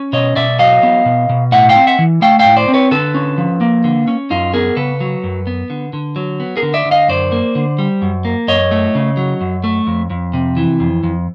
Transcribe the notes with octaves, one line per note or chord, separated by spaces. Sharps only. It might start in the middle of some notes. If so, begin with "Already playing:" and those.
Already playing: C#4
B2 C#5 D#5
B2 D5 E5
F#3 D#5 F5
B3
B2
B2
A2 E5 F#5
F5 G5
C4
E5 F#5
E3
A3 F5 G5
F5 G5
A2
C5 D5
C4
B4 C#5
D3 A4 B4
C#4
F3
A#3
D3
C#4
F#2 D#4 F4
B3 G#4 A#4
C#3 A4 B4
F#3
F#2
B3
D3
D3
F#3
B3
G#4 A#4
D3
D5 E5
D3
D#5 F5
F#2 C5 D5
A#3
D3
G3
F#2
A#3
F#2 C#5 D#5
A3
C#3
F#3
F#2
A3
F2
F2
C3
E3
F2
F2